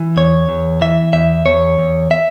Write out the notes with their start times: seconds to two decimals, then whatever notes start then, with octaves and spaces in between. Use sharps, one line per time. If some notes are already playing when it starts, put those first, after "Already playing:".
Already playing: E3
0.17 E2 C#5
0.49 E2
0.81 E3 E5
1.13 E2 E5
1.46 E2 C#5
1.79 E2
2.11 E5